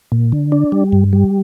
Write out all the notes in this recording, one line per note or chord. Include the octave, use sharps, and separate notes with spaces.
A#2
D3
D4
G3
G2
G3